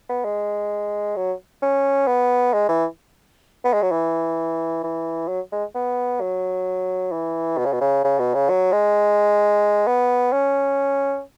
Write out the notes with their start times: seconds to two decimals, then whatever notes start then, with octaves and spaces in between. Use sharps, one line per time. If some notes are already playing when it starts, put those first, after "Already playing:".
0.09 B3
0.24 G#3
1.16 F#3
1.62 C#4
2.07 B3
2.53 G#3
2.69 E3
3.64 B3
3.73 G#3
3.82 F#3
3.91 E3
4.83 E3
5.28 F#3
5.52 G#3
5.75 B3
6.21 F#3
7.12 E3
7.58 B2
7.65 C#3
7.72 B2
7.81 C#3
8.04 C#3
8.19 B2
8.34 C#3
8.49 F#3
8.72 G#3
9.87 B3
10.32 C#4